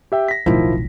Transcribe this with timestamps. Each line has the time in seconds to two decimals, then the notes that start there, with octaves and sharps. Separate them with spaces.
0.12 G4 E5 G5
0.28 A#6 B6
0.46 D1 B1 D#3 F3 E4